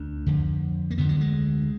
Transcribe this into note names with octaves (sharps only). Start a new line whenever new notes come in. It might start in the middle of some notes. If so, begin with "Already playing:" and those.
Already playing: D2 D4
F2 D3
A#3
D2 D3 B3
F#3
G#3